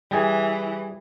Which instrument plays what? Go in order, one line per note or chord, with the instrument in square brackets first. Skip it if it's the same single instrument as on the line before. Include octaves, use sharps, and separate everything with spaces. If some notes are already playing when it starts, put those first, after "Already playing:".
[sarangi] E3 [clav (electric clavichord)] G3 G#4